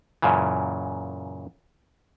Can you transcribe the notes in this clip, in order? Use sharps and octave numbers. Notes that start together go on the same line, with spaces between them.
F#2 A#2 C#3 E3